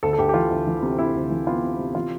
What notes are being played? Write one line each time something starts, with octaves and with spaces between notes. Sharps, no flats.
D2 A4
A4
D2 G4
G4
E3 F4
D2
E3
C3
C3 E4
D2
E3
B3 F4
C3
C3
E3 F4